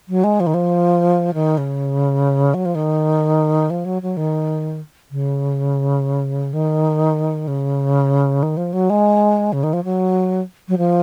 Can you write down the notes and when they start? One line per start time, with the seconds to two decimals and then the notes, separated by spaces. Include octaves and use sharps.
0.08 F#3
0.24 G#3
0.40 F3
0.47 D#3
0.54 F3
1.34 D#3
1.58 C#3
2.54 F#3
2.65 F3
2.75 D#3
3.70 F3
3.85 F#3
4.02 F#3
4.17 D#3
5.11 C#3
6.53 D#3
7.48 C#3
8.43 D#3
8.57 F3
8.73 F#3
8.90 G#3
9.53 C#3
9.63 D#3
9.73 F3
9.84 F#3
10.68 F#3
10.78 F3